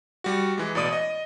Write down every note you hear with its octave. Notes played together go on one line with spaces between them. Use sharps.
G3 F#4
E3 G#3
A1 B2 D5 D#6 D#7
D#5